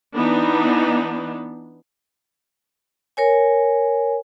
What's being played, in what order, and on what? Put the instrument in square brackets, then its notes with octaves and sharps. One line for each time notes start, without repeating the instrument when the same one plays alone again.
[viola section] E3 B3 D4 D#4
[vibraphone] A#4 C#5 G#5